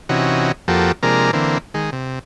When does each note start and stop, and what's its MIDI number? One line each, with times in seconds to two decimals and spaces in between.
0.09 0.52 48
0.09 0.52 52
0.09 0.52 61
0.09 0.52 63
0.09 0.52 66
0.68 0.92 41
0.68 0.92 53
0.68 0.92 58
0.68 0.92 66
0.68 0.92 67
0.68 0.92 69
1.03 1.31 48
1.03 1.31 53
1.03 1.31 56
1.03 1.31 58
1.03 1.31 62
1.03 1.31 70
1.33 1.58 50
1.33 1.58 52
1.33 1.58 58
1.33 1.58 60
1.74 1.90 51
1.74 1.90 56
1.92 2.19 48